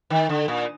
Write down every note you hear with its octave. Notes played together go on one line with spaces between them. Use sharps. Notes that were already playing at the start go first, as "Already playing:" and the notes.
D#3
D3
A#2